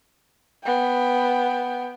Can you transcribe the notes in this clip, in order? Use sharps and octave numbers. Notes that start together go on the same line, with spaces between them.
B3 G5